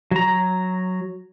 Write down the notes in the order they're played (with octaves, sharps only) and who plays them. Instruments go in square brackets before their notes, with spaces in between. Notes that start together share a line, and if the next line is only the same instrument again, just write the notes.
[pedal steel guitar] F#3 A#5